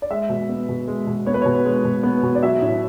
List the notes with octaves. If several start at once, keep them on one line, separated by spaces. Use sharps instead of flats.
D5
G#3 E5
B2
B3
B2
G#3
B2
B3 C#5
B4
B2 C#5
G#3
B2
B3
B2
D5
F#3 E5
A2